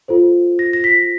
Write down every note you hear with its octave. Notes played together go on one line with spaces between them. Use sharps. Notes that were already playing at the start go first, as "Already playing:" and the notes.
F4 A4 C5
A#6
A#6
B6